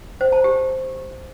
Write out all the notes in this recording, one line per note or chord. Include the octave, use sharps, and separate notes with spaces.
C5
A5
G4